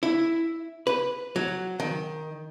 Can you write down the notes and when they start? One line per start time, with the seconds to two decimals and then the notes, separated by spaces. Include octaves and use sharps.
0.03 E4
0.87 B4
1.36 F#3
1.80 D#3